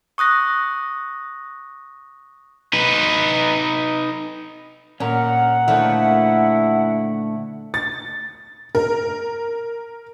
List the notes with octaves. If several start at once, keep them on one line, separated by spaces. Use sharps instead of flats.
C#6 D#6 F#6 A#6
D#4 B4
A#2 C#4 A#4 F#5
D3 F3 A3 D#4 E4 F#4
A6
A#4